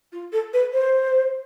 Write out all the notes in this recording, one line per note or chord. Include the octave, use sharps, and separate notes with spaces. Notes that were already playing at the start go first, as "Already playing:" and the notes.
F4
A4
B4
C5